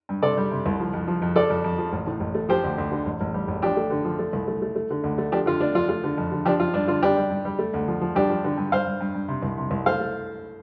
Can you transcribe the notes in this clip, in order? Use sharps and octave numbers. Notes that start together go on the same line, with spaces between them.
G2
C3 A4 D5
G3
C3
C2
F3
F2
F3
F2
F3 A4 D5
F2
F2
F3
A1
A2
A1
A3
F3 G4 C5
D2
D2
D3
A1
A1
G3
A1
F3 D4 G4
A3
D3
F3
A3
C2
A3
A3
A3
D3
D2
A3
F3 D4 G4
D3 F4
A3 D4
F3 F4
A3 F4
D3
F2
D3
F3 D4 G4
F3 F4
G2 D4
D3 F4
G3 D4 G4
G3
G2
G3
A3
D2
F3
F3
G2 D4 G4
F3
D3
G2
G2 C5 F5
G2
G2
G2
C3
C2
C3
C2
A3 C5 F5
A3